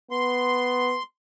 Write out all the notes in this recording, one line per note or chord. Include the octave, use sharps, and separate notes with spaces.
B3 C6